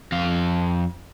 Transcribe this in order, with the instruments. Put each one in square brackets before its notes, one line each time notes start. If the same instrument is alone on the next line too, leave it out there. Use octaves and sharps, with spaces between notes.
[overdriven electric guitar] F2 F5